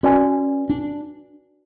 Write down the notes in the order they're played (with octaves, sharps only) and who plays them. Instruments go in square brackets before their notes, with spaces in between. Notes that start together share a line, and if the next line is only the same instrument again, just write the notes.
[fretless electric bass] C#4 [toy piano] F#4 B4 D5 G#5
[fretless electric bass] D4